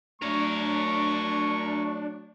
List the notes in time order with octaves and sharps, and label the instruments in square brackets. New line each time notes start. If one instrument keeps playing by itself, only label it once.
[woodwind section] F#3 A3 [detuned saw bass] D4 [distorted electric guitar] A#4 C#5 [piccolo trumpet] C#6